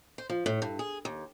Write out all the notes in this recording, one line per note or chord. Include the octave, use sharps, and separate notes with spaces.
C5
F3
A2
G2
G#4
D#2